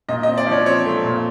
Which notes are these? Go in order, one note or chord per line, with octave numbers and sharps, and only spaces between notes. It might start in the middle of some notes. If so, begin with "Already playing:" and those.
A#2 D#5
C4 D#5
D5
F3 C#5
C4 C#5
A3
A#2